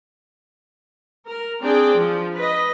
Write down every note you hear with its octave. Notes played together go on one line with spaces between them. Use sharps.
A#4
C4 D4 G#4 D5 G5
F3
B4 D#5